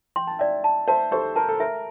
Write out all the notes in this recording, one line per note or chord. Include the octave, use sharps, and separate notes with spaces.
G5 C6
A5
D5 E5 G5
A5
C5 E5 A5
G4 A4 C5
A#4 A5
A4
A#4 E5